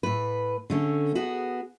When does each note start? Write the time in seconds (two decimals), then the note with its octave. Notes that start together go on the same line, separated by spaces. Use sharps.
0.03 A2 B4
0.70 D3 A3 C#4
1.15 B3 F#4 G#4